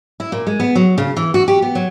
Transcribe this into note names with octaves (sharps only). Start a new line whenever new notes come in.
E4
A#2
G#3
B3
F#3
C#3
E3
F#4
G4
B3
F#3